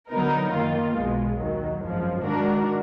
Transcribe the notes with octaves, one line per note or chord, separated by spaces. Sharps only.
D3 F#3 B3 D#4 A#4
F#2 D#3 A#3 F4
B1 B2 G#3
D#2 D#3 F#3
G#1 F#2 F3 G#3
D#3 G#3 D4 F#4 A#4